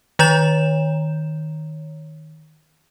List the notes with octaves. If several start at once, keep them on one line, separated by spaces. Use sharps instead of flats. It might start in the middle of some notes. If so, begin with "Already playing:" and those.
D#3 C#5 A#5 G6 E7